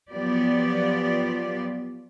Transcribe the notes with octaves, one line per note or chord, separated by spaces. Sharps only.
F3 F#3 B3 F4 G4 D5